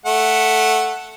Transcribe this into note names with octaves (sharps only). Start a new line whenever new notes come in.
A3 F#5